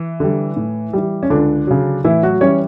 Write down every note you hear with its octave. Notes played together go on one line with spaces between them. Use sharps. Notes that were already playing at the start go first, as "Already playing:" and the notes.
Already playing: E3
D3 G3
A2
E3 G3
C#4
C#2 D3 D4
C#3 F#3
A2 E3 E4
F#3 F#4
E3 G3 C#4 C#5